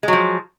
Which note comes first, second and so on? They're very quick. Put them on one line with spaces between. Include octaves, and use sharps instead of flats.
G#3 F#3 F3